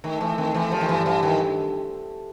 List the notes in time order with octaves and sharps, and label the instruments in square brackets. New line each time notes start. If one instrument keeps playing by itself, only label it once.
[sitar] D#3 [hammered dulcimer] A3
[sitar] E3 [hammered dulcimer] A3
[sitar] D#3 [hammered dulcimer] C4
[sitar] E3 [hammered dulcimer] A3
[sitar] F3 [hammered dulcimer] G3
[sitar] D#3
[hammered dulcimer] G2 [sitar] E3
[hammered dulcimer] D3 [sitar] E3
[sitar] D#3